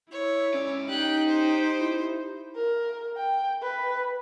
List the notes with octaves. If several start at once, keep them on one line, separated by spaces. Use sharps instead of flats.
E4 C#5
G#2 C#4 D5
D#4 G4 G5 F#6
C5
E4
A#4
G5
B4